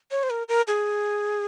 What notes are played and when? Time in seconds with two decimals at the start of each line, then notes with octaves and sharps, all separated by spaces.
0.11 C#5
0.23 C5
0.30 A#4
0.48 A#4
0.67 G#4